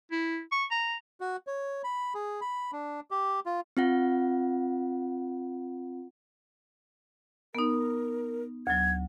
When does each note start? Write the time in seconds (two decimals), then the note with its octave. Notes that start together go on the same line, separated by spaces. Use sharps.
0.12 E4
0.52 C#6
0.71 A#5
1.20 F#4
1.47 C#5
1.84 B5
2.14 G#4
2.41 B5
2.72 D4
3.11 G4
3.46 F4
3.77 C4 F4 F#5
7.55 B3 D#4 A#4
8.67 D2 F#3 G#6